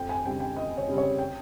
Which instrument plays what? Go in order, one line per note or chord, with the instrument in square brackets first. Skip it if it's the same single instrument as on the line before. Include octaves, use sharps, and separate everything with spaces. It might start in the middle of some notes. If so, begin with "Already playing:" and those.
Already playing: [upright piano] F2 G5
G#5
C#3 G3 C4 G5
G5
F2 D#5
C#5
C#3 G3 C4
C#5
G5